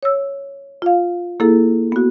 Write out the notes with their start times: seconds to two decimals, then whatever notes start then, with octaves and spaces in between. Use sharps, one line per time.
0.03 C#5 E6
0.82 F4 F5
1.40 A#3 E4 G#4 A4
1.92 B3 F#4